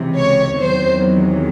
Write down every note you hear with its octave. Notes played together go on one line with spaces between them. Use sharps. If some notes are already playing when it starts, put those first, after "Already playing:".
Already playing: C#2 C3 E3
C#5
E2 C3 D#3 F#3 C5